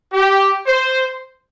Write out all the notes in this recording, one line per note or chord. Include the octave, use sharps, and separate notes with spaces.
G4
C5